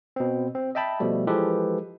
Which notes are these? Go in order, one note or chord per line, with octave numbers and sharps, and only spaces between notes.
B2 C4
C4
D#5 E5 G5 A5 B5
B2 F3 G3 A3
E3 F3 G#3 G4 A4 B4